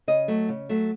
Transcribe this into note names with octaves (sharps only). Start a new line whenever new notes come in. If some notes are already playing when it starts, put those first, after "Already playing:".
C#3 D#5
F#3 A3
C#3
F#3 A3